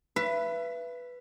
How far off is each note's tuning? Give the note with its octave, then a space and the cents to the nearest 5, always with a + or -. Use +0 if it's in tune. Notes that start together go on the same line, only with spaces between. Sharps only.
B4 +0 E5 +35